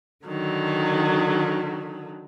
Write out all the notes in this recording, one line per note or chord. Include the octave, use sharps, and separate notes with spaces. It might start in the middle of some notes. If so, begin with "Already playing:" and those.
D3 D#3 F#3